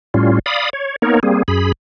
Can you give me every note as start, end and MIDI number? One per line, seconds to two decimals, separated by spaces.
0.14 0.39 45
0.14 0.39 55
0.14 0.39 61
0.14 0.39 65
0.46 0.70 74
0.46 0.70 77
0.46 0.70 83
0.46 0.70 87
0.73 0.96 73
1.02 1.20 58
1.02 1.20 59
1.02 1.20 63
1.02 1.20 70
1.02 1.20 73
1.23 1.43 55
1.23 1.43 58
1.23 1.43 60
1.23 1.43 68
1.48 1.72 42
1.48 1.72 68
1.48 1.72 83